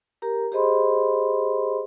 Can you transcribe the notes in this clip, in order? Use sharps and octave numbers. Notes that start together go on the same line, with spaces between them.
G4 A#4 A#5
G4 G#4 C5 D#5 B5 C6